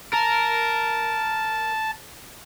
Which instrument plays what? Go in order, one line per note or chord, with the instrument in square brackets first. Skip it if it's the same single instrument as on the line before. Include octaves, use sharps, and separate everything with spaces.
[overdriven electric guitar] A#4 [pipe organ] A5